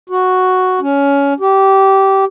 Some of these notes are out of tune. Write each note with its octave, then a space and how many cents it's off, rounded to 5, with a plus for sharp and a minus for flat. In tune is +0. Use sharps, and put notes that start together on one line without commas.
F#4 +0
C#4 +20
G4 -20